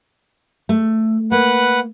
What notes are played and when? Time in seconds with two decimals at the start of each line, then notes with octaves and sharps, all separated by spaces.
0.69 A3
1.32 A#3 B4 F#5